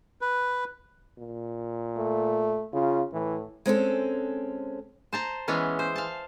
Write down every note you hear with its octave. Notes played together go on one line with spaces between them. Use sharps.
B4
A#2
A3
C#3 F4
A2 E3
G#3 C4 C#4 A4
C5 A5 A#5
E3 G#3 B3 C#4
C5
F5 A5